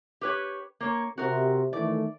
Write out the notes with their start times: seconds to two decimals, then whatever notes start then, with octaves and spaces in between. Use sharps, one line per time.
0.21 G4 B4 C#5
0.80 A#3 C#5
1.18 C3 F#4 A#4
1.73 D#3 E3 A3 D5